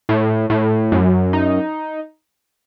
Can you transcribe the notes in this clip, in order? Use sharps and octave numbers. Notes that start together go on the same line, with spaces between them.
A2
A2
F#2
D#4